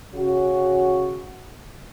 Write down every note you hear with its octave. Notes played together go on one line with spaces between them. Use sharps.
C#3 F#4